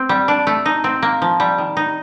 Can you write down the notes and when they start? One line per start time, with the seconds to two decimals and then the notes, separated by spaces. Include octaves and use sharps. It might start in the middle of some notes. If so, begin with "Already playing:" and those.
Already playing: C4
0.09 G3
0.28 D4
0.47 A3
0.66 D#4
0.84 C4
1.02 A#3
1.22 F3
1.40 G3
1.58 D#3
1.77 D#4